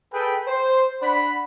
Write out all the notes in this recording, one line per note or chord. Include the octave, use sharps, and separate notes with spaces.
G#4 A4 B4 G5
C5
D4 F#5 B5